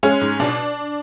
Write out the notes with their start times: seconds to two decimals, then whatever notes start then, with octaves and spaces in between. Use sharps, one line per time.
0.03 G#3 C#4
0.21 G#2
0.40 B2 D4